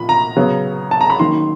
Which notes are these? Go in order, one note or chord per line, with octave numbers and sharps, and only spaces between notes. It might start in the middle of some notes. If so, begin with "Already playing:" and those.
Already playing: A#2 F3 B5
A#5
C#3 F#3 B3
A5
A#5
B5
D#3 F#3 A#3 C#4 C6